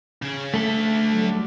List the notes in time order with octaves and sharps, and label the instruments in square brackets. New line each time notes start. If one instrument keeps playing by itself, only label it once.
[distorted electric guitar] C#3 G#4
[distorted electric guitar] D3 E5 [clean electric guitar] A3 A4
[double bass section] F#3 G3